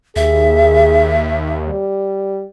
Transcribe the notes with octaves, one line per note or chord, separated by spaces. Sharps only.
D#2 G#4 E5
G3